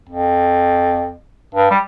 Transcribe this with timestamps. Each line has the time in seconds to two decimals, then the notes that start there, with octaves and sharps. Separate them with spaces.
0.09 F2
1.55 G2
1.70 G3